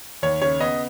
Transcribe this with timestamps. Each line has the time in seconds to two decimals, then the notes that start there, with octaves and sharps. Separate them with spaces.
0.22 D#2 C#5
0.42 C#3 C#5
0.60 B3 D#5